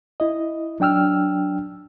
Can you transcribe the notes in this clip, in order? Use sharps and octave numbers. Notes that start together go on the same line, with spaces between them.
E4 D#5
F#3 D4 G5 E6 F6